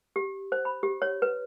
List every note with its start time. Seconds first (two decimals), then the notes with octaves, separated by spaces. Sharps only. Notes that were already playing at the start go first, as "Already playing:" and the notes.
0.16 G4
0.52 C5
0.65 B5
0.83 G4
1.02 C#5
1.22 B4